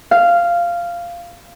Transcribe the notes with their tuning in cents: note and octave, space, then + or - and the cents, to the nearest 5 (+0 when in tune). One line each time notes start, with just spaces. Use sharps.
F5 -10